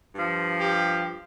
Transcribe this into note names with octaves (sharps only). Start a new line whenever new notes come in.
G2 F3
G4